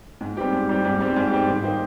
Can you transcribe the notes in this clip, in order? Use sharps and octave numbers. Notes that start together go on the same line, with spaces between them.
G#2
G3 C4 G4
G#2
G3 C4 G4
G#2
G3 C4 G4
G#2
G3 C4 G4
D#3
A#3 D#4 G4 C5